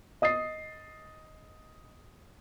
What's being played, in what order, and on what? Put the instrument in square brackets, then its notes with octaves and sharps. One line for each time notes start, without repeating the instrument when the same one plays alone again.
[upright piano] D#5 D#6 A6 C7